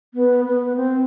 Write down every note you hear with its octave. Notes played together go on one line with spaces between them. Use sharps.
B3
B3
C4